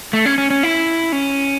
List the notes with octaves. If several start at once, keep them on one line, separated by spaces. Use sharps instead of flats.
A3
C#4
C#4
C#4
E4
C#4